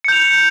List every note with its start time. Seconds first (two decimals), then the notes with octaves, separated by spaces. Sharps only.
0.04 C#7
0.08 G6
0.12 F7